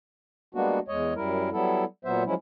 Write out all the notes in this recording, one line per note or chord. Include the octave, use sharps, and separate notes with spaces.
G3 G#3 A#3 B3 D4 F#4
E2 G#3 C#5 D#5
F#2 G3 E4 A#4
F#3 G3 B3 E4 A4
A#2 F#3 B3 C5 E5
F3 F#3 G#3 C#4 E4